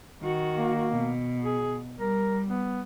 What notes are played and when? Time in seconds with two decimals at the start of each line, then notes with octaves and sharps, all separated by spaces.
0.22 D#3 F#4
0.56 A#3
0.90 B2
1.44 G#4
1.99 G3 A#4
2.49 B3